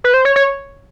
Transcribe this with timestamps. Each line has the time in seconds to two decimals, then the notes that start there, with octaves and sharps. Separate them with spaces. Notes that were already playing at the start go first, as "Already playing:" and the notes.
0.04 B4
0.14 C5
0.25 C#5
0.36 C#5